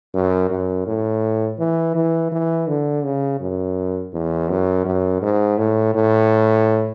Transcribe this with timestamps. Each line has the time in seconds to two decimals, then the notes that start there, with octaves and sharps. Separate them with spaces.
0.15 F#2
0.50 F#2
0.86 A2
1.59 E3
1.95 E3
2.32 E3
2.68 D3
3.04 C#3
3.40 F#2
4.13 E2
4.49 F#2
4.85 F#2
5.22 G#2
5.58 A2
5.95 A2